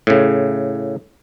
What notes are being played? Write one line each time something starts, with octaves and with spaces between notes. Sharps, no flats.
A2 C#3